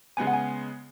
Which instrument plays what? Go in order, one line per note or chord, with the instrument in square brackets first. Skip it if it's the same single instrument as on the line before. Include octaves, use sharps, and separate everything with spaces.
[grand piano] C#3 G#3 B3 [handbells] G#5
[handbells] F#5
G#5